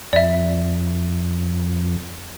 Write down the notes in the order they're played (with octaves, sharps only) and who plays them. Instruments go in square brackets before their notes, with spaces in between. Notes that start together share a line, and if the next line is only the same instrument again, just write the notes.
[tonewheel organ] F2 [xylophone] D5 E5